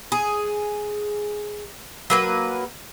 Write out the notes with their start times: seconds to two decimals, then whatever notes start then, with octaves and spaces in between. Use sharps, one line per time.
0.12 G#4
2.10 F#3 A#3 B4